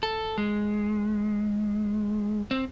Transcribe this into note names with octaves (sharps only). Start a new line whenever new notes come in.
A4
G#3
C4